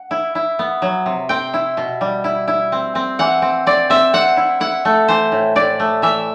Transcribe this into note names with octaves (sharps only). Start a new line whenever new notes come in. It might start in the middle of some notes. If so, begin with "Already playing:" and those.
Already playing: F#5
E4
E4
B3
F#3
C3
C4 G5
E4
B2
G3
E4
E4
C4
C4
E3 F#5
C4
C4 D5
C4 E5
C4 F#5
E4
E4 F#5
A3
E3 C5
A2
A2 D5
A3
E3 E5